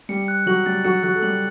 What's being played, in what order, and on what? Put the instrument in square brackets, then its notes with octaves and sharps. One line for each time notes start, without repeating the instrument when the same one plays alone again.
[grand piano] G3 G4 [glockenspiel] C#7
[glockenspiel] F#6
[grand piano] F#3 F#4 [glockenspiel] F#7
[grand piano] G3 G4 [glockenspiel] A6
[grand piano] F#3 F#4 [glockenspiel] C#7
[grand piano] F#3 F#4 [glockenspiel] F#6
[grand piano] A4
[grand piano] G3 G4 [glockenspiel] F#7